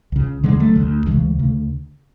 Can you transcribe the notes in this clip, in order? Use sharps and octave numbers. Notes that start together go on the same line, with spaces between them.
C#2 C#3
D3 E3 G#3
D2
F#3 A3
D2 D3
D2 C#3 E3 G#3
D2 C#3